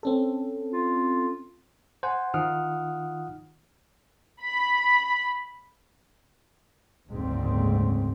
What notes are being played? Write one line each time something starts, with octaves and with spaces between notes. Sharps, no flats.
C4 C#4 A4
F4
C5 F#5 G#5
D#3 D#4 F4 F#5 D#6 F6
B5
F#1 D2 G#2 C#3 A#3 C4